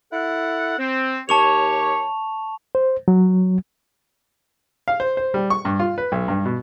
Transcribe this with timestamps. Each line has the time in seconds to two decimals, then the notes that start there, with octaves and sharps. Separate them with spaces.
0.13 E4 A4 F#5
0.79 C4
1.29 D#2 G4 C#5 A5 C#6 F7
2.75 C5
3.08 F#3
4.88 F5
5.00 C5
5.17 C5
5.34 G3
5.50 C#6
5.65 G2
5.80 F4
5.98 B4
6.12 B1
6.28 G2
6.46 B2